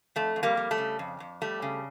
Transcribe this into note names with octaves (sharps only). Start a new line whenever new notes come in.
F2 A3
F2
G3 A#3
G3
A3
C#3
F2
F2
G3 A3
C#3